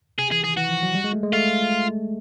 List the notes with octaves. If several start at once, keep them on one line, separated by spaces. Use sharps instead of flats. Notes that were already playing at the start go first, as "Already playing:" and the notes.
C3 G#4
E3 G#4
D#3 G#4
E3 F#4
F3
F#3
G3
G#3
A3
G#3
A3 F4